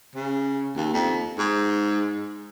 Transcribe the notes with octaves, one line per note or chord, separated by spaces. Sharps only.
C#3
D#2
F2
G#2